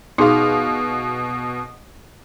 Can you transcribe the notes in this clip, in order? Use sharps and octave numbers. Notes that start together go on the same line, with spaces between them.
B2 D#4 G#4 F5 C6